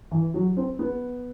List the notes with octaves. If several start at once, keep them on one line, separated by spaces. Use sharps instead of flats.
E3
F#3
C4
B3